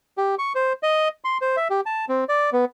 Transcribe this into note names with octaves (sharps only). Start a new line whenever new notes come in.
G4
C#6
C5
D#5
C6
C5
E5
G4
A5
C4
D5
B3